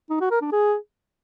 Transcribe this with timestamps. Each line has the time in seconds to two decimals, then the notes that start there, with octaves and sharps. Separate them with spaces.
0.10 D#4
0.21 F#4
0.31 A#4
0.41 D4
0.52 G#4